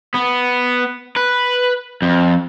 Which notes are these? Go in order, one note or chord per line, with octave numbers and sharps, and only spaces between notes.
B3
B4
F2